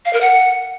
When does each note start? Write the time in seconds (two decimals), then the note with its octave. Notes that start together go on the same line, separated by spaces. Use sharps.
0.05 F5
0.13 A#4
0.21 F#5